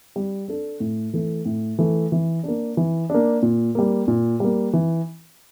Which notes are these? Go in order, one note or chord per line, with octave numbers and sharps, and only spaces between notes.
G3
D4 A4
A2
E3 A3
A2
E3 A3
E3
A#3 D4
E3
A#3 D4
A#2
G3 A#3
A#2
G3 A#3
E3